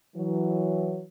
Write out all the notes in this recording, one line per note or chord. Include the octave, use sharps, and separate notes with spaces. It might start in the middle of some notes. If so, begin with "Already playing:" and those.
E3 F#3